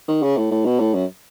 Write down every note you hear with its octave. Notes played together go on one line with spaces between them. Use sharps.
D#3
C#3
A2
A2
B2
A2
F#2